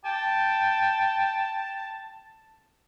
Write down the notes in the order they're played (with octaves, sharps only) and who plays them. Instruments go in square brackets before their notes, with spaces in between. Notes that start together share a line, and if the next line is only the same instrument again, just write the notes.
[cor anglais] G5 [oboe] A5